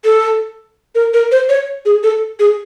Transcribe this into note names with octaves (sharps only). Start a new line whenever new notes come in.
A4
A#4
A#4
C5
C#5
G#4
A4
G#4